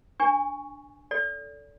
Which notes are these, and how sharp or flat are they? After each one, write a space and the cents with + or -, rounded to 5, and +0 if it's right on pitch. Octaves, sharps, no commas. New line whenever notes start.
D4 +0 G#5 +0 C#6 +0
A4 +0 D5 -35